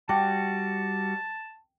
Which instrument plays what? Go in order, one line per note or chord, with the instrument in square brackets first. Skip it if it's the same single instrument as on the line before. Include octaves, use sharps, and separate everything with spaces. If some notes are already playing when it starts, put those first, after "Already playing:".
[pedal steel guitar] G3 F#4 [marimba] G5 D6 [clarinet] A5